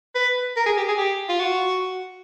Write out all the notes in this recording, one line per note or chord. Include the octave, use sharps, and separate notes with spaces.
B4
A#4
G#4
G4
G#4
G4
F4
F#4